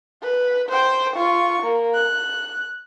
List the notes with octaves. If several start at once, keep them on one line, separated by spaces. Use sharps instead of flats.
B4
C5 G5
F4 C#6
A#3
F#6